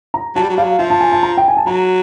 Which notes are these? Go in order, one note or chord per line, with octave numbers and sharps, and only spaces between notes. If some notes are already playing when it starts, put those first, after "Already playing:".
A#5
F#3 A5
G3
F#3
G3 F5
F#3
F3 E5
A5
G#5
A5
A#5
G5
G#5
A5
F#3 A#5